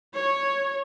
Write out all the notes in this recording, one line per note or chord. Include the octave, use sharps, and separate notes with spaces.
C#5